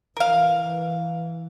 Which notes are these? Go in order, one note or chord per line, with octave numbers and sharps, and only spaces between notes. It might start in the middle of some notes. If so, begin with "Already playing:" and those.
E3 A#4 F5